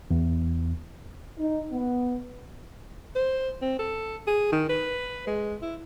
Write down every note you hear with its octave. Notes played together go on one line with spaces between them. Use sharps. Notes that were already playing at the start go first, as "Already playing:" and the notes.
E2
D#4
B3
C5
C4
A4
G#4
D#3
B4
G#3
E4